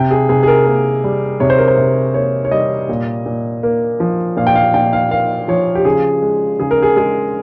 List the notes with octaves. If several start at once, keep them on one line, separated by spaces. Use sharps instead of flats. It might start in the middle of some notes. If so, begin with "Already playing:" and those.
Already playing: C3 G5
G#4
C3 G#4
G#4
A#4
A#3
G3
C3 C#5
C5
A#4
C5
C3
A#3 C#5
C#5
G3 D#5
A#2
A#2
A#3
F3
A#2 F5
G5
F5
A#2 G5
F5
A#3 F5
F3 C#5
G4
C#3 G#4
G#3
C#3 G#4
A#4
G#4
G#3 G#4